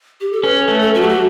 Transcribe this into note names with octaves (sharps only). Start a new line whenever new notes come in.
G4
A4
C#4 B4
A4
A3 B4
A4
F#3 F#4
G4
F#4